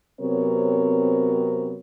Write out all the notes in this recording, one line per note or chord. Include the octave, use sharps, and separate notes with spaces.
C3 F#3 B3 C4 A#4 C#5